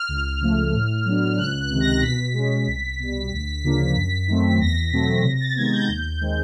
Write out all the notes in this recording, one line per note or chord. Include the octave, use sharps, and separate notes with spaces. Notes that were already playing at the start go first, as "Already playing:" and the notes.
Already playing: F6
C#2
C#3 F3 A3
A2
F#3 B3 D4
C#2 F#6
F#6
C3 D#3
A#6
B2 B6
G#3 C#4
C2
B2 G3
D2
C#3 F3 A#3 D4
F#2
D#3 F#3 A3 C4
E2 A#6
B2 F#3 A3 C4 B6
C3 A#6
A#6
A6
D#3 G#3 B3 G#6
G6
D#2
D#3 G#3 C4